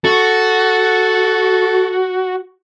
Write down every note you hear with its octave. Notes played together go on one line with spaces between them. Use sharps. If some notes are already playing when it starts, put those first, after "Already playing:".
F#4 A4